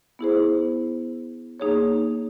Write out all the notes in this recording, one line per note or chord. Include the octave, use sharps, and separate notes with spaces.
B3 E4 G#4 C5
A#3 D#4 G#4 C#5